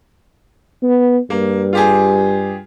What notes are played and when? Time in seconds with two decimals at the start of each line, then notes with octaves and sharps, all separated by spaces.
0.83 B3
1.30 G2 A#3
1.73 F4 G4 G#4